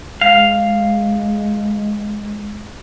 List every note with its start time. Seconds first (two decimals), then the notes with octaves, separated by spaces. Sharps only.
0.21 G#3 F5